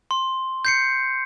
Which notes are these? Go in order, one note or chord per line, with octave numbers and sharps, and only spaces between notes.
C6
G6 C7 C#7